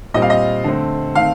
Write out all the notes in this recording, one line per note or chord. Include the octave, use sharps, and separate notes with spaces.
A#2 G3 C4 D#5
F5
D#5
D3 A3 C4
D#3 A3 C4 F5